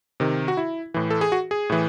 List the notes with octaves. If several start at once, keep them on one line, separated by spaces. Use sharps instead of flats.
C3 D#3
F#4
E4
A2 E3
A4
G#4
F#4
G#4
A2 E3